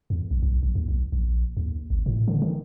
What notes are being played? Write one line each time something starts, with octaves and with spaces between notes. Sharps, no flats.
E2
A#1
B1
A#1
D#2
B1
A#1
D#2
G#1
A2
D3
D#3